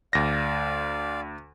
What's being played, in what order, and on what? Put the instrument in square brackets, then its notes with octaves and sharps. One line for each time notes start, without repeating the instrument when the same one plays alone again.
[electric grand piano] D2 A#6 [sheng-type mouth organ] D5 F5